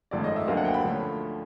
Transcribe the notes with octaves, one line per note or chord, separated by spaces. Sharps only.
G#1 G#2 F3 A3 C#4 D5
D#5
E5
D2 D3 F#3 A#3 F5
F#5
G5
B5
D3 F3 A3 C#4